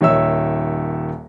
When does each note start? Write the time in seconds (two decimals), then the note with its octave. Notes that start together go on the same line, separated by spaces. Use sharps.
0.01 D#1 D#3 C#5 E5 E6